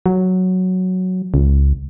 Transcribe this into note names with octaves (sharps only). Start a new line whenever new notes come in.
F#3
C#2